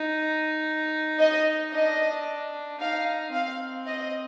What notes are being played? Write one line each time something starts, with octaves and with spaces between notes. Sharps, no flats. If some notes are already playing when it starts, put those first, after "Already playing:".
Already playing: D#4
D#5
D4 D#5
D#4 F5
C4 F5
D#5